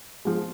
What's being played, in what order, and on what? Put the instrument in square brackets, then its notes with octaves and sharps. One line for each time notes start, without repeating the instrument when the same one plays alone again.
[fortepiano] F3 G#3